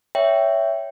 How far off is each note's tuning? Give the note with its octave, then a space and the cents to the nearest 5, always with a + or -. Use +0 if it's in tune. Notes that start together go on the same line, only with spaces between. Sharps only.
C#5 +15 E5 +0 G5 +0